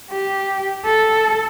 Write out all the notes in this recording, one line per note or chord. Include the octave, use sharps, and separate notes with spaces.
G4
A4